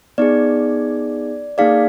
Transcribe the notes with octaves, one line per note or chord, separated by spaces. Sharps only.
B3 D#4 G#4 D5
A#3 D#4 G#4 D5 F5